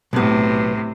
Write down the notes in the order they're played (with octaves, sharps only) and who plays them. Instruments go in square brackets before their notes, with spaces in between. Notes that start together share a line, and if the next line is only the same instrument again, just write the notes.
[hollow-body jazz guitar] B1 B3 [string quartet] A2 C3